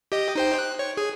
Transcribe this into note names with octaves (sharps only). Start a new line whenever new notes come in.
G4 D#5
D#4 C5 G5
F#6
C#5
G#4